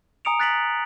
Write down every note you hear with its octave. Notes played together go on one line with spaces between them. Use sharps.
G#5 A#5 D#6 C#7 D7 F7
F#6 A6 B6 D7 F#7